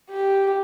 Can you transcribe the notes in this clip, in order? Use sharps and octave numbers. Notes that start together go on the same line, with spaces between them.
G4